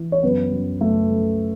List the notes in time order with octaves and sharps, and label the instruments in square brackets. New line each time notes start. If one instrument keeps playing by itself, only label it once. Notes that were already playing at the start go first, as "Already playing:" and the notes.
Already playing: [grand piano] E3
C#5
F#2 B3 B4
F#2
F#2 A3 A4
F#2